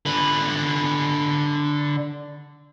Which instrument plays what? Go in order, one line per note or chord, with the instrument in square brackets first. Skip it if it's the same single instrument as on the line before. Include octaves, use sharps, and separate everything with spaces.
[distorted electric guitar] D3 B4